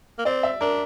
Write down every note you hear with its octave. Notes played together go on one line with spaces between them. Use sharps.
A#3
C4 D5
E5
D4 A#4